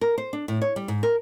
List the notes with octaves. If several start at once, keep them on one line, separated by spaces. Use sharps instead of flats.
A#4
C5
D4
A2
C#5
G3
G#2
A#4